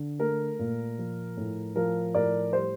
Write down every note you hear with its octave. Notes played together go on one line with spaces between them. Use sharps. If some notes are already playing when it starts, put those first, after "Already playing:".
Already playing: D3
A3 A#4
A#2
F3
A2
F3 A#4
A2 A#4 D5
G3 C5